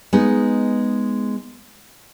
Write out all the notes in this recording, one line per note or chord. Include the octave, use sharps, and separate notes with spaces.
G#3 B3 D#4